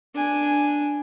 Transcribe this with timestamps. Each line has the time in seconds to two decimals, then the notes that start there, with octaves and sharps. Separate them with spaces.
0.15 D4 G#5